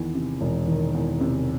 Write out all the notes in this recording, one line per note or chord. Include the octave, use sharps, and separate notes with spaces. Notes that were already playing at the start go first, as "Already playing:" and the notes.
Already playing: E2 D#3
C3
E1
D#3
E2
C3